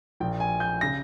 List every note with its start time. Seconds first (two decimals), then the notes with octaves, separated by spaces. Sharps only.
0.20 A#1 A#2 G5
0.40 G#5
0.60 G6
0.81 C#3 A#6